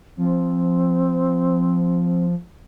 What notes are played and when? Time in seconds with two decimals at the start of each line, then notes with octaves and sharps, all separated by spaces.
0.17 F3 C4